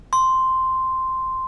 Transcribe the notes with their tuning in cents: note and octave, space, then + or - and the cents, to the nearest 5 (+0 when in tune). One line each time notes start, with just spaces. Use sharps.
C6 -5